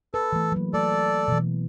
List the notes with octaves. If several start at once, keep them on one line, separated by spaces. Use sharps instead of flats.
A4 B4
E3 A3
F#3 A#3
A3 A4 D5
B2 E3